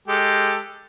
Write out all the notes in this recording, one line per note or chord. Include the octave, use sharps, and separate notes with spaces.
G#3 G4 A4